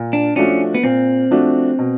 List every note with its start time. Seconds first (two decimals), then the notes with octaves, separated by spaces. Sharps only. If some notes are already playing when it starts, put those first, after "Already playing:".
Already playing: A#2
0.13 D4
0.36 F3 A3 C#4 D4 F#4
0.75 B3
0.84 A#2 C4
1.31 F3 A3 D4 F#4
1.79 B2